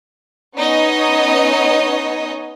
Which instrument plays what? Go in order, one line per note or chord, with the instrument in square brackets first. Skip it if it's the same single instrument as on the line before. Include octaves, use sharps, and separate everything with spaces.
[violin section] B3 C#4 D#4 C#5 D#5